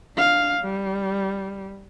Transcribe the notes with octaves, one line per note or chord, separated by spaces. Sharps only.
D4 F5
G3